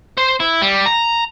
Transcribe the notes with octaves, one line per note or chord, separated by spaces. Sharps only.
C5
E4
G3
A#5